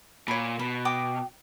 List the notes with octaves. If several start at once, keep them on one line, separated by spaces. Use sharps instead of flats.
A#2 C#5 B5
B2 B5
G5 D6 D#6